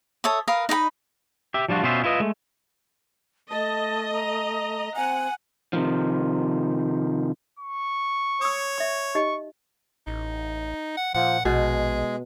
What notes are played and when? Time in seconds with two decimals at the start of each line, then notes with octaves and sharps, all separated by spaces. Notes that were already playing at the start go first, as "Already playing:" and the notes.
0.24 A4 C#5 E5 D#6
0.48 A#4 B4 F5 D#6
0.69 D#4 D#5 F#5 B5
1.54 G4 E5
1.69 F3 G3 D4 F4 F#4
1.83 B2 B3 C#4 F4 C5 E5
2.04 E4 F4 B4 D#5
2.20 G#3 A3
3.50 A3 D#5 A5
4.13 A#5
4.96 C4 F#5 G#5
5.73 C3 D#3 F3
7.59 C#6
8.41 C#5 D#6 E6
8.78 E5 C#6
9.15 D#4 G4 D#5 C#6
10.07 A1 D#4
10.97 F#5
11.15 A#2 F3 F#5
11.45 A#1 B2 G#3 G#4